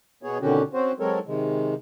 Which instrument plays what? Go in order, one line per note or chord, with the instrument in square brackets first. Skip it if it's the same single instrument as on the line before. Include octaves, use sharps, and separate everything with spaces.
[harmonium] B2 B3 G#4 C#5
B2 D3 D#3 C#4 F#4 G4
C4 C#4 F#4 C5
F#3 G#3 C4 A4 A#4 C#5
C3 D#3 G#3